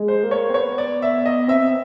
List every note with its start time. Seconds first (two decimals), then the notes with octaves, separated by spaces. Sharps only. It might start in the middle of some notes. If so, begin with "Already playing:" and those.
Already playing: G#3
0.08 C5
0.24 A#3
0.31 C#5
0.50 C4
0.54 B3 C#5
0.78 D5
1.02 E5
1.26 D#5
1.48 C4 E5